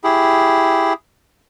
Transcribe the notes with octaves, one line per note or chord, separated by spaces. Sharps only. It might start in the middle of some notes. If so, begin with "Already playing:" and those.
E4 G4 G#4